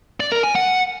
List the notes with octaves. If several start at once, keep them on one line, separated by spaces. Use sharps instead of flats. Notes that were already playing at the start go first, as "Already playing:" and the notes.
D5
A#4
G#5
F#5